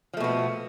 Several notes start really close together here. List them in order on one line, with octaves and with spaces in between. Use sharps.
F3 A3 B2 B3